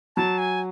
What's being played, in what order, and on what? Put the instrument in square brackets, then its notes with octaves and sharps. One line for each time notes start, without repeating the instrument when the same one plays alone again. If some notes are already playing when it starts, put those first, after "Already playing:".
[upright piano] F#3 [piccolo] A5
[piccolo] G#5